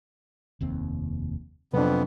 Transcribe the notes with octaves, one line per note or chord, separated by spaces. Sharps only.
F1 D#2 C4
F2 C3 F#3 B3 C4 D4 B4